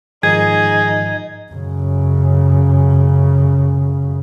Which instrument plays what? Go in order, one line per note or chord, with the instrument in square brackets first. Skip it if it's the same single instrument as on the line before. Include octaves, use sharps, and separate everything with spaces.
[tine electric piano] G#2 D#3 F3 [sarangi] D#4 [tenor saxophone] G#4 [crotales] G#6
[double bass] F#2 C#3